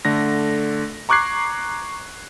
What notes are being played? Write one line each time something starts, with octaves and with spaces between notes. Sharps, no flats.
D3 A3 A#6
A#5 C#6 D6 F#6 G#6 C7